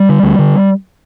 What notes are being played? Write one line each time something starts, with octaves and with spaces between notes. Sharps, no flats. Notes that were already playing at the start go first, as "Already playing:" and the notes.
Already playing: G3
D3
D2
D3